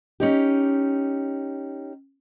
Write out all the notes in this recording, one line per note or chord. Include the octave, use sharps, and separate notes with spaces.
C#4 D#4 G4